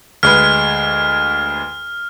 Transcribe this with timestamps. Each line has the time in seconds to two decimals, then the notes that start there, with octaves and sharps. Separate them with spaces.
0.23 D2 G#3 B4 F6